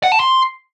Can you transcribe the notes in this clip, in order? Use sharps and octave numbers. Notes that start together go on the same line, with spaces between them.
F#5
A5
C6